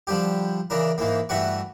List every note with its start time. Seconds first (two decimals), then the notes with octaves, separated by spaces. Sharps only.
0.07 D3 F3 G3 G4
0.70 C#3 E3 D4 A#4
0.98 G#2 E3 A#3
1.29 G2 E3 A3 F#4 F#5 C#6